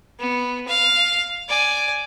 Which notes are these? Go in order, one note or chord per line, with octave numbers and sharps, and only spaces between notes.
B3
F5
D5 G#5